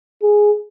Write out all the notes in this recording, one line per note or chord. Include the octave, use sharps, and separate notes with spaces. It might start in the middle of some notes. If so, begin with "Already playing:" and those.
G#4